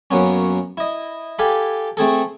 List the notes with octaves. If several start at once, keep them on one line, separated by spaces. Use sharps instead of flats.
F#2 A#3 B3 C#4
E4 D#5
G4 A4 F5 G#5 B5
A3 C4 G#4 A4